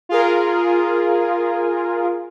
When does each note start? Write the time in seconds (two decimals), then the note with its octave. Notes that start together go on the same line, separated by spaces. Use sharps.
0.09 F4 G#4 A#4